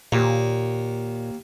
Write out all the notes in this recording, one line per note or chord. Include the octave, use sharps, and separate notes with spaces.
D#2 A#2